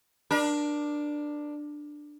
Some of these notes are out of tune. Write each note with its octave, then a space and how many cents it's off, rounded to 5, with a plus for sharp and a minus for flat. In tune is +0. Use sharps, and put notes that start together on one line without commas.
D4 +10 A#4 +35